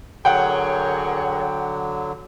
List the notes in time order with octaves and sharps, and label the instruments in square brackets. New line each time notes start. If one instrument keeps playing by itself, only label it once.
[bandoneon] D3 F#3 [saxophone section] G#4 A#4 C#5 [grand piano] F#5 G5